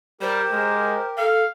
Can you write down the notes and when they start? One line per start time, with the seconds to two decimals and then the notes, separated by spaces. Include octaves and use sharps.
0.21 G3 G4 A#4 C5
0.51 G#3
1.18 A4 F5